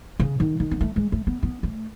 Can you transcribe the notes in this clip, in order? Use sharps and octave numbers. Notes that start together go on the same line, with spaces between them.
C#3
D#3
D#3
B3
A3
G#3
A3
B3
B3
A3